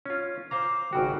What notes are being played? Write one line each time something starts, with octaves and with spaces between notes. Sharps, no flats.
C#4 F4
C5 F5 A#5 D6
G#1 C#3 F#4 G5